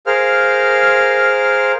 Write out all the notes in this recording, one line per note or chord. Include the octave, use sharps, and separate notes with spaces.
G#4 A#4 C5 F5 F6